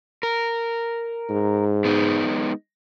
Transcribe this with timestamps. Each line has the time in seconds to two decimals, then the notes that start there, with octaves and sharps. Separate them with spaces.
0.23 A#4
1.29 G#2
1.85 G#3 B3 D#4